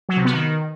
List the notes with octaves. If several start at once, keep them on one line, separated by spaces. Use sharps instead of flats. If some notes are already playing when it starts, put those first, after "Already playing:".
F#3
C3
B3
D#3